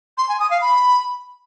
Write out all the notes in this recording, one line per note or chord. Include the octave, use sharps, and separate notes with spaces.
C6
G#5
D#6
F5
B5